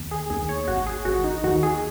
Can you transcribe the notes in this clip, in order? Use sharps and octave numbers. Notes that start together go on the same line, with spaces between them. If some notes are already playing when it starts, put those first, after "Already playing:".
Already playing: D#2
G#4
D#2 G#4
C#5
G#1 F#4
G#4
G#1 F#4
D#4
D#2 F#4
G#4